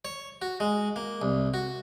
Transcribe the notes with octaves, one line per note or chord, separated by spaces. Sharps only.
C#5
F#4
G#3
A#3
C2
F#4